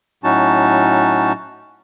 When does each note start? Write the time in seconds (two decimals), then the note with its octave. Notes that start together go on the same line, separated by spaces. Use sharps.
0.24 A2 F#3 C#4 D#4 F#4 A5